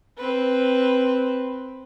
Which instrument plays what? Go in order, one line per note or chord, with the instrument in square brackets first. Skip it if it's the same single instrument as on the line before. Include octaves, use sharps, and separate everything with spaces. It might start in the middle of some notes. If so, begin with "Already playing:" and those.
[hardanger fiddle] C4 B4